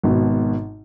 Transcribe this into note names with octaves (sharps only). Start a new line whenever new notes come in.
G#1 B2